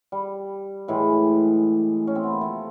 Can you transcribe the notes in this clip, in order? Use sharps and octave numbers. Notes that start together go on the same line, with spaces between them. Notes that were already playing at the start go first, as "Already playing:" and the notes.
G3
A2 E3 G#3
C#4
C4
B3
A#3
C3 F3 A3